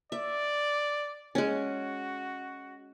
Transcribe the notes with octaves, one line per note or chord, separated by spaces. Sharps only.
D5 E5
G#3 C#4 F#4